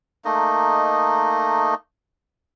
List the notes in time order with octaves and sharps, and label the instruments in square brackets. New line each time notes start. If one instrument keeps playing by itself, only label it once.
[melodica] A3 A#3 D#4 D#5